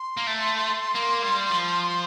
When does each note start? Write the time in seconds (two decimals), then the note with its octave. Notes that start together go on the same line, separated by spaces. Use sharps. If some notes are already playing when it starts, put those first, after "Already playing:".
Already playing: C6
0.17 A#3
0.27 A3
0.95 A#3
1.23 G3
1.50 F3